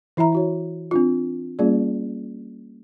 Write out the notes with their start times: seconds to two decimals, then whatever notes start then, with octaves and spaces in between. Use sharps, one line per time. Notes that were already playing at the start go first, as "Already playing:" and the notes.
0.17 E3 E4 E5 A#5
0.33 E4 F#4 C#5
0.91 C4 D4 F4
1.59 G3 A#3 C#4 F4 G#4 D5